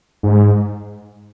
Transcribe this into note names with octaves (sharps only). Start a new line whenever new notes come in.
G#2